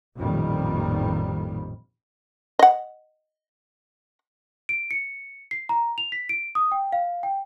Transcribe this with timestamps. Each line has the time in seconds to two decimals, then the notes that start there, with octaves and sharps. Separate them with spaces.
0.16 A1 F2 A#2 D#3 G3
2.59 D#5 F#5
4.69 D7
4.91 C#7
5.51 C7
5.69 A#5
5.98 F7
6.12 B6
6.29 D7
6.55 D#6
6.72 G5
6.93 F5
7.23 G5